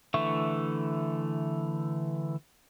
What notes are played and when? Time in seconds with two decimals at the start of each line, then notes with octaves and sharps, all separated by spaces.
0.14 D3 E3 A3 E5 C#6